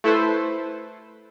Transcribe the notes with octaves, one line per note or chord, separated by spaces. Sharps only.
A3 E4 A4 B4 C5